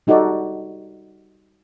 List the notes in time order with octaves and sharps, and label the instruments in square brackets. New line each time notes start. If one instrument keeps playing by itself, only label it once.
[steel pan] G3 D#4 F#4 A4 D5